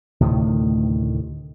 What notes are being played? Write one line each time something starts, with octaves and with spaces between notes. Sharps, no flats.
D2 A2 C3 D#3